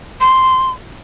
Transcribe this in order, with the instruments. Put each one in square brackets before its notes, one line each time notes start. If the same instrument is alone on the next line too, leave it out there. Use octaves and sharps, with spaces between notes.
[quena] C6